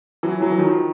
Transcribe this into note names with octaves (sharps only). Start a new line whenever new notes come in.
E3 F#3
E3 F#3
E3
D#3 F3